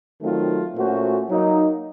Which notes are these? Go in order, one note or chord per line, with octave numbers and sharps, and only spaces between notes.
D#3 F#3 A3 C4 F4
A#2 A3 C#4 F#4 C5
F#3 A#3 D#4